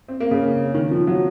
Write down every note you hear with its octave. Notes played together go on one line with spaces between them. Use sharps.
C4
A#3
C#3
D#3
F3
F#3